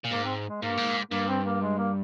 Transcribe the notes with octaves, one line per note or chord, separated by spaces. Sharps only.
A#2
G#2 A#3
C4
G#3
G#2 A#3
G2
G#2
G2 A#3
C4
A#3
G#3
A#3